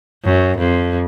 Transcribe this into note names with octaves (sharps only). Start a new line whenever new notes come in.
F#2
F2